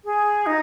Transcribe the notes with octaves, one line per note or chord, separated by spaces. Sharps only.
G#4
D#4